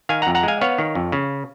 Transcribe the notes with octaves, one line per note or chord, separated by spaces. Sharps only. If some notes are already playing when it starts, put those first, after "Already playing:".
D#3 F5 G#5
F#5 A#5
F2
F#5 A#5
G#3 F5 G#5
B3 C#5 F5
D#3
F2
C#3